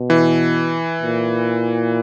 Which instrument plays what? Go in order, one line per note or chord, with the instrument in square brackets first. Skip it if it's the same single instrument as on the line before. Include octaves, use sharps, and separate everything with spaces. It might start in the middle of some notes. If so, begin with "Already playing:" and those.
Already playing: [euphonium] B2
[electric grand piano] E3
[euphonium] A#2